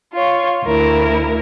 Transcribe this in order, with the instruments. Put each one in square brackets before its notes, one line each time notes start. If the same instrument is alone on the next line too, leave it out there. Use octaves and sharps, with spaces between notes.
[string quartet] F4 C#5
D2 E4 A#4